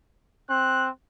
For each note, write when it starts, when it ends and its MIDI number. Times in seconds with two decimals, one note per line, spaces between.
0.50 0.90 60
0.50 0.88 90